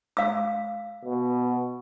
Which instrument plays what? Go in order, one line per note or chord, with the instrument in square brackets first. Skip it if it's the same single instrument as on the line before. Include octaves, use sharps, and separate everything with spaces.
[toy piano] F5 E6
[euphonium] B2